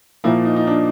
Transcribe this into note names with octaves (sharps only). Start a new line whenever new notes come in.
A#2 F3 A#3 E4
D#4
D#4
D4